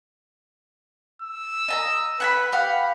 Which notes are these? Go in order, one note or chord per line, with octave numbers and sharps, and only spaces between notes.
E6
D#5 A5 A#5
B4 F#5 G#5 B5
G4 F5 F#5 B5